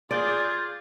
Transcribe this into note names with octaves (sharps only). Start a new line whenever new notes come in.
F4 G#4 D5 D6 G6 A6